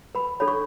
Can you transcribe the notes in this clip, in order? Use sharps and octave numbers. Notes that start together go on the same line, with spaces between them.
B4 B5
D4 A4 C#5 B5
C#6